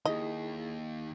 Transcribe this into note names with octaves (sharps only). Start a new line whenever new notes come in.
D#2 D#4 E4 G#4 D#5